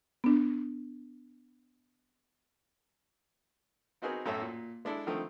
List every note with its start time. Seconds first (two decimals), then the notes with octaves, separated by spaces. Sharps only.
0.24 B3 D4
4.02 B3 C4 D#4 F#4 G#4 A#4
4.25 B1 F#2 A2 A4 C#5 E5
4.42 A#2
4.85 G#3 D4 E4 A4
5.06 D3 D#3 F3 A3 C4